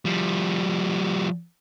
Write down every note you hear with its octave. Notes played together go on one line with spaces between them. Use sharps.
F3 G3